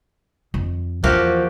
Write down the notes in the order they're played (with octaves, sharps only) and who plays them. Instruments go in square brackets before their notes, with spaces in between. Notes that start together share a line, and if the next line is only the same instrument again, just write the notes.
[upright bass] F2
[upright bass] E2 E3 [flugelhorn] F3 [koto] A#3 F#4 G4